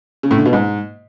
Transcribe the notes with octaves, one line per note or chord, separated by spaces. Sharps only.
C#3
A2
D3
B2
G#2